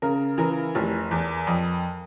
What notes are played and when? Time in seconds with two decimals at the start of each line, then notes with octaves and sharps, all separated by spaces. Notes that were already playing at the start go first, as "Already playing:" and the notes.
0.02 C#3 A#4
0.38 E3 A#4
0.75 F1
1.11 E2
1.47 F2